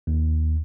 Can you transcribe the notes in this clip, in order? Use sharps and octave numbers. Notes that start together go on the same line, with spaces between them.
D#2